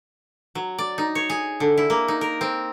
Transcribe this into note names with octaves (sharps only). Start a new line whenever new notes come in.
F#3
D5
D#4
C#5
G#4
D3
E4
A#3
D#4
A#4
C4